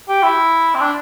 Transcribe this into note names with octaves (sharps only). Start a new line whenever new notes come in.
G4
E4
C4
D4